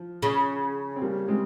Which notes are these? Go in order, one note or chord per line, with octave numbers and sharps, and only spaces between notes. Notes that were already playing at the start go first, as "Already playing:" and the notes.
Already playing: F3
C#3
C4
G3 A#3
G#3 C4